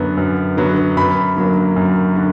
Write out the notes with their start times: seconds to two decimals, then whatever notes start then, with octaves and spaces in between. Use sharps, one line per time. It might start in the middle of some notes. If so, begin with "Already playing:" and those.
Already playing: F#2 D3 F#3 B3
0.17 F#2
0.57 D3 F#3 B3
0.97 F#2 B5
1.36 D3 F#3 A#3
1.76 F#2
2.16 D3